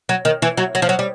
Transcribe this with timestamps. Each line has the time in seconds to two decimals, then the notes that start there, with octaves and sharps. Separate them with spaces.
0.09 F#3
0.25 D#3
0.42 E3
0.57 F#3
0.75 F#3
0.82 F3
0.89 F#3
0.99 G3